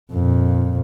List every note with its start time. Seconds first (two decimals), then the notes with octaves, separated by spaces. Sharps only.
0.12 F2 A#2